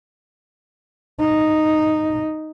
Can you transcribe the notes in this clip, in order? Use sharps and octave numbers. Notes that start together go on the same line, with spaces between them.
D#4